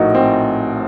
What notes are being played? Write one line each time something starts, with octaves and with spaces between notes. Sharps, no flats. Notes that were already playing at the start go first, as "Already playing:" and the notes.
Already playing: A#1 A2 A3 D#4 F#4 A#4
C4